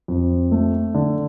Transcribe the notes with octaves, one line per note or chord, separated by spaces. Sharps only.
F2
A3
D3